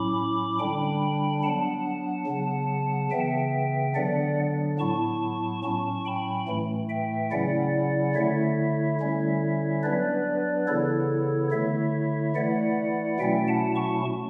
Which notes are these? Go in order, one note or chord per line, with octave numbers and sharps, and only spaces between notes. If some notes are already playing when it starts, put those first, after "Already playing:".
Already playing: A2 F#3 C#4 E4 B5 D6
D3 G3 D4 G5 B5
F#3 B3 D4 F#5 A5
C#3 F#3 B3
C#3 E3 B3 E5 G5
D3 F#3 B3 D4 D5 F#5
A2 F#3 B3 E4 A5 C#6
A2 F#3 C#4 A5 C#6
G5 B5
A2 E3 A3
E5 G5
C#3 F#3 C#4 E4 D5 F#5
D3 A3 E4 C#5 E5
D3 G3 C#4 E4
F#3 B3 D4 B4 D5
C#3 E3 B3 E4 A4 C#5
D3 A3 E4 C#5 E5
E3 A3 E4 D5 F#5
B2 F#3 A3 C#4 E4 E5 G5
F#5 A5
A5 C#6